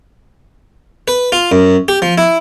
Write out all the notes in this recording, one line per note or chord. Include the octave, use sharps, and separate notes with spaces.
B4
F4
F#2
G4
F3
E4